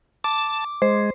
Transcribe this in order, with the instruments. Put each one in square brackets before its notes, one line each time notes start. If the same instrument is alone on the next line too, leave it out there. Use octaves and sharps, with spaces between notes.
[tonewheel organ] A5 [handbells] D6
[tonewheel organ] G#3 [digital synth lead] C5